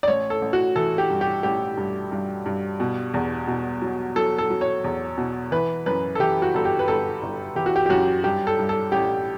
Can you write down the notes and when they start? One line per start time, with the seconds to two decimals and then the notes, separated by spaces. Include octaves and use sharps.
0.03 D5
0.08 A1 C#5
0.30 A4
0.42 A1
0.53 F#4
0.76 E3 A4
0.98 G4
1.10 G2
1.21 G4
1.43 A1 G4
1.77 G2
2.12 G2
2.46 G2
2.80 B2
3.14 E2
3.47 B2
3.82 F#3
4.16 F#3 A4
4.38 A4
4.50 F#3
4.61 C#5
4.84 E2
5.18 B2
5.52 E3 B4
5.86 F#2 B4
6.15 A4
6.20 E3 G4
6.42 F#4
6.54 G1 A4
6.65 G4
6.79 B4
6.88 G1 A4
7.22 G1
7.55 E3 G4
7.66 F#4
7.76 G4
7.86 G4
7.89 F#2 F#4
8.24 G2 G4
8.47 A4
8.59 G2
8.69 A4
8.92 A1 G4